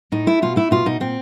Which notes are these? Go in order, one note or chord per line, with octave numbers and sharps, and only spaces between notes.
A2 D#4
A3 E4
B2 F4
A3 E4
B2 F4
B2 D#4
A#2 C4